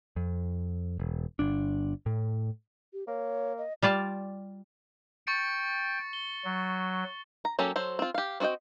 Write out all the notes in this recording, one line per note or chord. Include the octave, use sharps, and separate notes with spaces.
F2
E1
G1 D4
A2
G4
A#3 C#5
D#5
G3 F4 D5 A5
G5 C#6 A6 C#7
G7
F#3
A#5
F#3 A#3 C#4 G4 A4
F#3 A4 C5
C4 F4
G4 F5
C4 F#4 G#4 D#5 G5